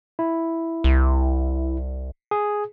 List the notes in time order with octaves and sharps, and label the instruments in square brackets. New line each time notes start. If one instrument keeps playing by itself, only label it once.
[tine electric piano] E4
[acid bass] C2
[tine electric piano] G#4